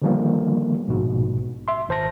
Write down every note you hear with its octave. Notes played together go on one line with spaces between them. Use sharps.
D3 D#3 F3 G3 A#3 B3
A#1 G#2 B2
E5 C6
G#1 C5 A5 A#6